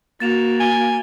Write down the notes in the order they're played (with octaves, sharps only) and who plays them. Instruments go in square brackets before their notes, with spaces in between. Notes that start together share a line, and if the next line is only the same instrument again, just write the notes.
[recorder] A#3 [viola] F#4 [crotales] A6 E7 F7
[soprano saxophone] G#5 [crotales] G7